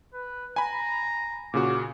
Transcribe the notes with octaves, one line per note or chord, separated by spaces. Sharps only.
B4
G#5 A#5 B5
A#2 C#3 F#4 D6